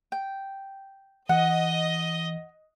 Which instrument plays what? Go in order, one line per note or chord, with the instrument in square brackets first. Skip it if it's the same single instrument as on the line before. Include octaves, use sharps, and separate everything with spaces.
[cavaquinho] G5
[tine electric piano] E3 [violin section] D#5 [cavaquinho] F#5